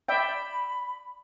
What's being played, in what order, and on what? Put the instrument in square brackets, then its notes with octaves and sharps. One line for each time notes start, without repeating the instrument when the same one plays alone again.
[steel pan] D5 E5 G5 [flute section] B5